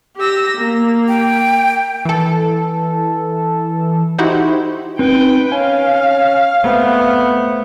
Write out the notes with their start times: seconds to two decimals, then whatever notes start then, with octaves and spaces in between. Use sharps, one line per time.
0.18 G4 E6 A#6
0.56 A#3
1.08 G5
2.05 E3 A4
4.18 D#4 E4 F#4 G4 C5
4.99 C4 D#4 B4 G5
5.52 C#4 F5 G#5
6.64 A3 B3 C4